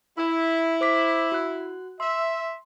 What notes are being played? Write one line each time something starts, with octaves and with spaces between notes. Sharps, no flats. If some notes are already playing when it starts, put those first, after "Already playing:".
E4
C5 D6 B6
F#4 F#6
E5 C6